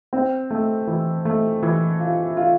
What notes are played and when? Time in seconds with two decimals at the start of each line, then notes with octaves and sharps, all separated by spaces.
0.13 C4
0.50 A3
0.87 E3
1.25 A3
1.63 E3
1.99 F4
2.37 F4